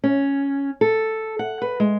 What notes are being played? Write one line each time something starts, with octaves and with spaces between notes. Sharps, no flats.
C#4
A4
F#5
B4
G#3